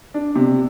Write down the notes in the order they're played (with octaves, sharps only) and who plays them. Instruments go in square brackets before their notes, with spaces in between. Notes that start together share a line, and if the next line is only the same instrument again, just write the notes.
[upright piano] D4
C3